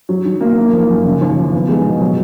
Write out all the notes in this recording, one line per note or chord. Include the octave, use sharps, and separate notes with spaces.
F#3
D#3
A#3
A#3
F3
F#2
C#3
D#2
F3
B3
G#3
B2
F#3